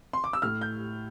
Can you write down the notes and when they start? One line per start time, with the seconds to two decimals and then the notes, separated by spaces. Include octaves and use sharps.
0.13 C6
0.24 D6
0.33 E6
0.42 A2 F6
0.61 G6